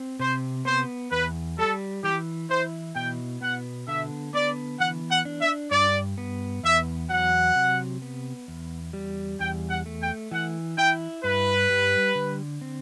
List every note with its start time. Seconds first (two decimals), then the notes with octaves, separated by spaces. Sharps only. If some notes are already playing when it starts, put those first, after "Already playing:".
Already playing: C4
0.19 C3 C5
0.65 B3 C5
1.11 E2 B4
1.58 G3 A4
2.03 E3 G4
2.49 E4 C5
2.95 B2 G5
3.41 B3 F#5
3.88 D3 E5
4.34 B3 D5
4.79 E3 F#5
5.10 F#5
5.25 D4
5.41 E5
5.71 G2 D5
6.18 B3
6.63 E2 E5
7.10 F#3 F#5
7.56 C3
8.02 B3
8.48 E2
8.93 G3
9.40 E2 G5
9.70 F#5
9.86 A3
10.01 G5
10.31 E3 F#5
10.78 E4 G5
11.24 G2 B4
11.70 G3
12.15 D3
12.61 C4